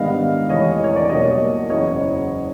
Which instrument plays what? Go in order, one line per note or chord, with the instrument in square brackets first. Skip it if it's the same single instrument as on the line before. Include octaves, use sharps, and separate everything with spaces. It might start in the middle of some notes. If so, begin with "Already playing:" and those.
Already playing: [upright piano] G#2 D#3 G3 B3 D4 D#5 F5
E2 C3 E3 A3 C#5 D#5
C#5
D5
B1 B2 G3 A#3 C#5 D#5
F#1 E2 C#3 C#5 D#5